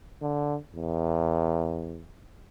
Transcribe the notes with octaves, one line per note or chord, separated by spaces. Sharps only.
D3
E2